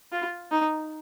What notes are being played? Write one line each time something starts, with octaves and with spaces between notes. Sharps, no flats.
F4
D#4